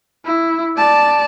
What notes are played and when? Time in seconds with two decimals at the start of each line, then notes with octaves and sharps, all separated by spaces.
0.25 E4
0.77 D5 A5